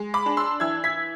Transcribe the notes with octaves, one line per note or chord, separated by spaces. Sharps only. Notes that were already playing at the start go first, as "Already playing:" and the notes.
Already playing: G#3
B5 D6
D4
C6 E6
E3 E6 G#6
G#6 B6